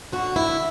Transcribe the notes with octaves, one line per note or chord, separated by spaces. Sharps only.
D3 F#4
E4